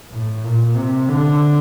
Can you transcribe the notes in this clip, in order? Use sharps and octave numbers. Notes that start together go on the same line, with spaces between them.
A2
A#2
C3
D3